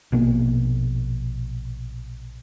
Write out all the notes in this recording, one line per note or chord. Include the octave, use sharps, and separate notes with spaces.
A#1 B2 A#3